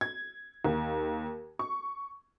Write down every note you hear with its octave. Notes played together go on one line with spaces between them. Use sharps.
G#6
D#2
C#6